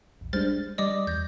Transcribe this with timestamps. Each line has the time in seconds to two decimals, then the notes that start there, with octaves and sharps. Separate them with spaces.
0.21 A#1 E2
0.33 G3 G#3 D4 C5 F6 A6
0.78 G3 D5 D#5 D6 D#6
1.07 E2 G6 A6 A#6